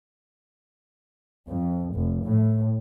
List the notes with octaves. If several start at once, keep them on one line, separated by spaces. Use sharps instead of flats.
F2
F1
A2